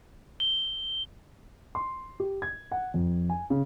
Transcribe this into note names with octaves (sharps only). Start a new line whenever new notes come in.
G7
C6
G4
G#6
F#5
F2
G#5
C#3